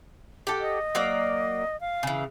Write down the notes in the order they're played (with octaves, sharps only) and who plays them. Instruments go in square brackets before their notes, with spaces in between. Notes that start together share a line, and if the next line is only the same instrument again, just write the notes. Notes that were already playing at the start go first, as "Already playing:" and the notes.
[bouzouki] G4 A4 F#5
[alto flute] D#5
[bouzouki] F#3 A#3 D5
[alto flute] F5
[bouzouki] C#3 E3